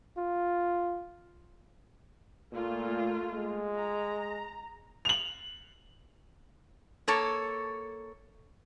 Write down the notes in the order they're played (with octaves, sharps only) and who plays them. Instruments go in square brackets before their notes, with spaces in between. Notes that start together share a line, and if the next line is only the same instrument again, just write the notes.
[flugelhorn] F4
[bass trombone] A#2 [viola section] A3 A#3 F4
[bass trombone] G#3
[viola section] A#5
[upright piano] F7 F#7
[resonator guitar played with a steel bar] A#3 A4 C#5